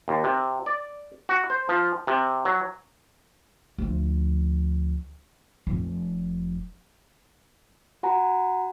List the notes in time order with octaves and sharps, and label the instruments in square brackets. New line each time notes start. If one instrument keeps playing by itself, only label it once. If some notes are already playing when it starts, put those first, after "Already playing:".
[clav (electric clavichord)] D#2
C3
D5
F#4
C5
F3
C3
F#3
[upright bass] D2 F3
F1 F2
[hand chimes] F#4 F#5 G#5 A#5